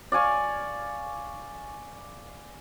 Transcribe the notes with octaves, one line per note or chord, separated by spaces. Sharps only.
D5 F5 G#5 C#6